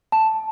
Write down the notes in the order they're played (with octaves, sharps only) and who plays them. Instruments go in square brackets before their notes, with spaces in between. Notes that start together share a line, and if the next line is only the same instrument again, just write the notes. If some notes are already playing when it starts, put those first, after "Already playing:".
[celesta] A5